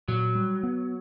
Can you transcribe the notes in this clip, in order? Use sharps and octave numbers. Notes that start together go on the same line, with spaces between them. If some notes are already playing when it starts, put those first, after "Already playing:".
A#2 F#3
G3
B3